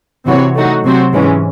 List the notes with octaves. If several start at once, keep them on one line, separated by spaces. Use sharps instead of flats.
C3 E3 C4 F#4 C#5
F#3 A3 D#4 F#4
C3 F#3 C4 F#4 C5
G#2 E3 G#3 C#4